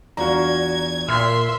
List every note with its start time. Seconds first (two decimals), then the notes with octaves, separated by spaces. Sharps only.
0.17 E2 D4 F4 F#4 A#5 G#6
1.09 A#2 E5 C6 F6